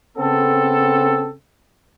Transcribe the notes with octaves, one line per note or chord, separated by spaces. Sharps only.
C#3 B3 C4 A4